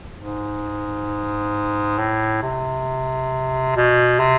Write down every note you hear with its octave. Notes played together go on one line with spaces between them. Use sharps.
G#2
A2
C3
B2
C3